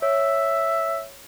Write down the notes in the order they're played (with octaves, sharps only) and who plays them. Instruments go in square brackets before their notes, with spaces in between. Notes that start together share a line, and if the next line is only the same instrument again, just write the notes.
[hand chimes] C#5 [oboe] E5